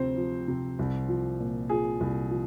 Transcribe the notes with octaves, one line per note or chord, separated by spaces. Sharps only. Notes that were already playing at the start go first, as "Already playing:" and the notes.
Already playing: D2 C3 F3 C4 C5
F3
C3
C2
F3
A#2
F3 G#4
C2
F3